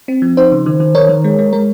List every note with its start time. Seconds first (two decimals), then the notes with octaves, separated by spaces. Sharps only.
0.08 C4
0.22 F3
0.37 D#4 C5
0.52 C#3
0.66 D#3
0.80 D#3
0.95 D#3 A#4 C#5
1.09 D#3
1.24 G#3
1.39 G#3
1.53 G#3 A#4